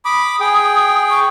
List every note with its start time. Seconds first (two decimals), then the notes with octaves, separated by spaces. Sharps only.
0.05 B5 D6 D#6
0.40 G#4 G5
1.10 C#6